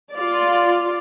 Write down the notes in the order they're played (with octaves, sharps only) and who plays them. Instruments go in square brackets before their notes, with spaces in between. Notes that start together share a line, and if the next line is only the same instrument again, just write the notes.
[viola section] F4 D5